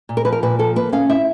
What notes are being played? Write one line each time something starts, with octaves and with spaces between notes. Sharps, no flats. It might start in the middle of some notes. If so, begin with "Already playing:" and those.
A#2
A#4
F3 B4
A#4
A#2 B4
F3 A4
A#3 B4
C#4 F5
E4 E5